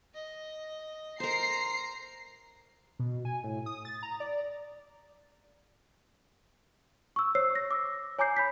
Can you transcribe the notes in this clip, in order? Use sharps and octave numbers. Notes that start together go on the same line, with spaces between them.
D#5
A#4 C5 A#5 C7
B2
G#5
A2
D#6
A6
A#5
D5
C#6 E6
C5 C#5 E6 C7
A#6
D6 E6
C#5 G#5 A#5 D6 G6 C7
B5 G6 B6